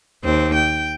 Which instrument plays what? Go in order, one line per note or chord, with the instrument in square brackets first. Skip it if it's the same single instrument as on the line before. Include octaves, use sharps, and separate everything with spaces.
[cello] D#2 C4
G5